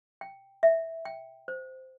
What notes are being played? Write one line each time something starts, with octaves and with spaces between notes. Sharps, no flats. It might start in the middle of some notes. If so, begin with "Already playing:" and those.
G5
E5
G5
C5